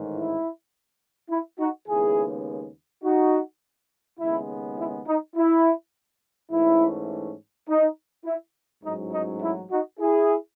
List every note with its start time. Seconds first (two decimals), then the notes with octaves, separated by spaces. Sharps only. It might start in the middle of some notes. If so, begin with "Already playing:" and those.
Already playing: A1 G#2 D#3
0.14 E4
1.30 E4
1.59 D#4 F#4
1.88 D#2 C#3 G#3 B3 E4 G#4
3.04 D#4 F#4
4.20 D#2 C#3 G#3 B3 E4
4.78 E4
5.07 D#4
5.36 E4
6.51 G#2 E3 A3 C#4 E4
7.68 D#4
8.25 E4
8.84 A1 G#2 F#3 D#4
9.12 D#4
9.42 E4
9.71 D#4 F#4
10.00 E4 G#4